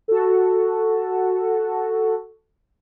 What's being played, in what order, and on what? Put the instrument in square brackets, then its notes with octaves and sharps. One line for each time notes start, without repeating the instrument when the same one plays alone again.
[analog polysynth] F#4 A4